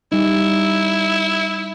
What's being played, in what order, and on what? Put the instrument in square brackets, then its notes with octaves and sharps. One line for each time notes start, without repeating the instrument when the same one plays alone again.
[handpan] G3 D#4 [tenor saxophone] E4